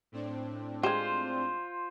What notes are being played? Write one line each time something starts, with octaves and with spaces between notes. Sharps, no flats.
A2 C4 D4
G#3 F4 G4 C5